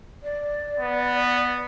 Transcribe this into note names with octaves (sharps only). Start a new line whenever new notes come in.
D5
B3